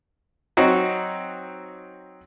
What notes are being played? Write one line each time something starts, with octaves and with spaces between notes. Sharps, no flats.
F#3 C4 D#4 F#4